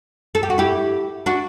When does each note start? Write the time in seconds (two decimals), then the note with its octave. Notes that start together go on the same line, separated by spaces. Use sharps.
0.35 A4
0.43 G4
0.50 F#4
0.58 E4 G4
1.26 D4 F#4